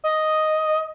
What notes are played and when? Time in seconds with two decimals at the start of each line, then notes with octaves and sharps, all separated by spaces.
0.04 D#5